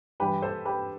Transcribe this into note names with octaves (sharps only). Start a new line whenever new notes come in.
G2 E3 G4 B4
A4 C5
G4 B4